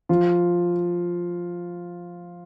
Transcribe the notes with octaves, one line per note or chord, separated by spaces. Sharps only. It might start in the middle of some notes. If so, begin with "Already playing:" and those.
F3 F4